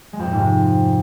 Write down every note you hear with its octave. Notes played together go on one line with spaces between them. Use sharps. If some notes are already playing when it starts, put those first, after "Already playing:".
G#3
F2
A#2
G#2
C3